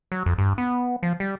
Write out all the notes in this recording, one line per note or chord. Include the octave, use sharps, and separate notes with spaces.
F#3
F2
G2
B3
F3
G3